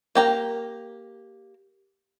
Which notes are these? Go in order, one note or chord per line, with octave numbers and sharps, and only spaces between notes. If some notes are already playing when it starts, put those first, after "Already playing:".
A#3 G4 A#5